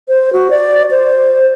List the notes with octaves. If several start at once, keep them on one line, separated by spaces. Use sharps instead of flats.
C5
F#4
D5
C5